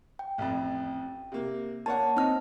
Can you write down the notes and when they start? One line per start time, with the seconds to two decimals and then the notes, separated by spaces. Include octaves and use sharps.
0.19 G5
0.38 A1 F2
1.32 C3 A#3
1.86 A#3 C#5 F#5 A5
2.17 C4 D#4 F6